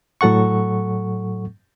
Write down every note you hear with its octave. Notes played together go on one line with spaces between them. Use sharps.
A2 F#3 A4 F#5 C#6